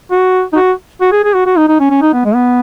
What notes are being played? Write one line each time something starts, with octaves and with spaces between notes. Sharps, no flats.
F#4
D#4
F#4
F#4
G#4
G#4
F#4
F#4
D#4
D#4
C#4
C#4
D#4
B3
G#3
B3